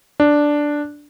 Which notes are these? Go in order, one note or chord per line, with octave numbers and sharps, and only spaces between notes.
D4